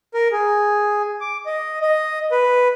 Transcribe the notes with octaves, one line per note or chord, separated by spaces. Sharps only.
A#4
G#4
D6
D#5
D#5
B4